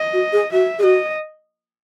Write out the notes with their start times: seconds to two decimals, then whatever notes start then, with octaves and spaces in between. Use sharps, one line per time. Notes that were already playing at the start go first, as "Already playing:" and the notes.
Already playing: D#5
0.12 F#4
0.32 G#4
0.52 F#4 E5
0.78 G#4
0.82 F#4 D#5